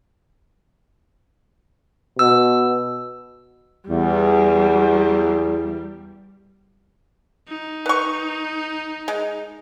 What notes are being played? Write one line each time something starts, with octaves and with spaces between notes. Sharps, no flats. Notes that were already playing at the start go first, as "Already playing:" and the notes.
B2 E6
E2 G3
D#4
B4 C#6
G#3